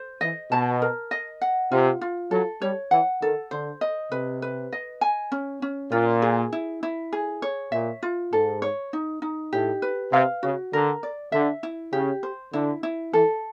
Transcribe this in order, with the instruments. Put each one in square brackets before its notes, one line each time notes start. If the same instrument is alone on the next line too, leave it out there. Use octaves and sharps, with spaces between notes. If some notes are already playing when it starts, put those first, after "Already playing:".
Already playing: [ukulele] C5
[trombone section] E3 [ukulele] D#5
[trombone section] B2 [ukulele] A5
[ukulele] A#4
D#5
F#5
[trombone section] C3 [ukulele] F4
[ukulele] F4
[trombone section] F#3 [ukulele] A4
[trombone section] G3 [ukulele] C#5
[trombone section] E3 [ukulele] F#5
[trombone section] D#3 [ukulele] A4
[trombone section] D3 [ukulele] C5
[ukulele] D#5
[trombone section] C3 [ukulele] B4
[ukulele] B4
D#5
G#5
C#4
C#4
[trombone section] A#2 [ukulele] F4
[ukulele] G#4
E4
E4
G#4
C#5
[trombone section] A#2 [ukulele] E5
[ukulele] F4
[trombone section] G#2 [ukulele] A4
[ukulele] C#5
D#4
D#4
[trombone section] A2 [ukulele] G4
[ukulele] B4
[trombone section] C3 [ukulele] F5
[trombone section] C#3 [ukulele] F#4
[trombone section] D3 [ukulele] A#4
[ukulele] D5
[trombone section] D3 [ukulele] E5
[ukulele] E4
[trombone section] C#3 [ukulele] G4
[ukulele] C5
[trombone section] D3 [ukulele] E4
[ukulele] E4
[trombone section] E3 [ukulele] A4